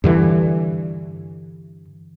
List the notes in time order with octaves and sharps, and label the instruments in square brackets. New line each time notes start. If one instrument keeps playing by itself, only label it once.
[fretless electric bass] G2 D3 E3